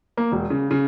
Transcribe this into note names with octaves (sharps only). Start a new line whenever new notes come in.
A#3
E1
C#3
C#3